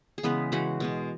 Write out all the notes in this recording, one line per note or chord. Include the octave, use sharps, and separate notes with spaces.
G#4
C#3 E3 G#3 B3 B4
C#3 E3 G#3 F#4 F#5
B2 G#3 B3